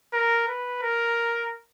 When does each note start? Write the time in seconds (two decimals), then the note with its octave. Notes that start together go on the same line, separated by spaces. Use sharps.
0.13 A#4
0.48 B4
0.82 A#4